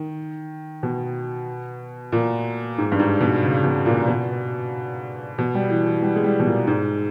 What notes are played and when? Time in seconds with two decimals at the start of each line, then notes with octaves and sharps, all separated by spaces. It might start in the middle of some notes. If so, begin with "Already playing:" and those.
Already playing: D#3
0.83 B2
2.12 A#2
2.78 G#2
2.92 G2
2.99 G#2
3.20 B2
3.43 C#3
3.64 B2
3.86 A#2
4.07 B2
5.38 B2
5.55 G3
5.70 E3
5.86 E3
6.02 G3
6.16 G#3
6.24 G3
6.39 B2
6.46 A#2
6.67 G#2